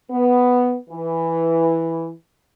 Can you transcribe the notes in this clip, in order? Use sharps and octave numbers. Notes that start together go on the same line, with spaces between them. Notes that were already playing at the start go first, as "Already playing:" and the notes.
B3
E3